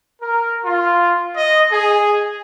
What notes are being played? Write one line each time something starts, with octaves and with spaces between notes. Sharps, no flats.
A#4
F4
D#5
G#4